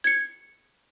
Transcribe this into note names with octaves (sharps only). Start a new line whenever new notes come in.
G#6 C#7